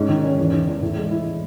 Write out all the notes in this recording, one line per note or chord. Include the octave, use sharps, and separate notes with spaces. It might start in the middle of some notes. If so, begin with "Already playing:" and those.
Already playing: G#2 C#4
D#3
C#4
E2
D#3
E2
A2
G#3
E4